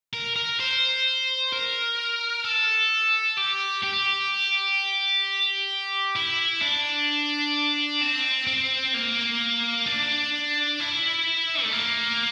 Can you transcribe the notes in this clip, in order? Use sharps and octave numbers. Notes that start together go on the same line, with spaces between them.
A#4
A#4
C5
A#4
A4
G4
G4
E4
D4
C4
C4
A#3
D4
E4
A3
A#3